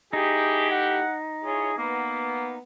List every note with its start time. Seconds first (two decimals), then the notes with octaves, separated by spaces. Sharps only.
0.13 A3 D#4 E4 G4 G#4
0.70 F#5
1.44 E4 F4 G#4 C#5
1.78 A#3 B3